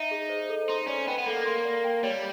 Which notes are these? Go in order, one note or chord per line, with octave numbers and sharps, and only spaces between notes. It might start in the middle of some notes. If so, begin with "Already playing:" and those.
Already playing: D#4 E5
G#4
C5
A4
D#4 C6
C#4 D5
B3 G5
B3
A#3 A4
C6
D5
G5
G3 C#5